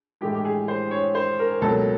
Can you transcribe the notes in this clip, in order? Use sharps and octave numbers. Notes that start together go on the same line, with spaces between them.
A2 E3 G#3 G4
G4
G#4
C5
C#5
C5
A#4
C#2 B2 F#3 A#3 A4